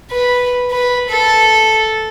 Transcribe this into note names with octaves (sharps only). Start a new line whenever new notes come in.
B4
B4
A4